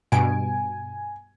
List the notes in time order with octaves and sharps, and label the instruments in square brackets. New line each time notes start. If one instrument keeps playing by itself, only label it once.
[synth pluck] G2 B2 D7 [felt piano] G#5